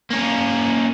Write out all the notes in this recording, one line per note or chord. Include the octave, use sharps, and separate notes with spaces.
A#3 C#4